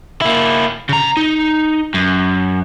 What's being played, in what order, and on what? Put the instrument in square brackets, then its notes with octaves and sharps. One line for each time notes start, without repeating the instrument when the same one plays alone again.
[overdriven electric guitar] A#3 E4
C#3 A#5
D#4
F#2